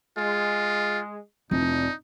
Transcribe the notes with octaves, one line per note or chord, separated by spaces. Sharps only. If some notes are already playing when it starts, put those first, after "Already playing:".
G#3 F4
F1 E3 D4 D#4